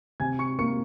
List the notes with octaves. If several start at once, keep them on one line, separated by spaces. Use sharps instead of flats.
C3 G#5 G#6
C#6 C#7
A#3 C#6 C#7